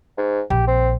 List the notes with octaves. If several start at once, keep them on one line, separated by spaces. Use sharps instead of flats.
G#2
A#1 G4
C4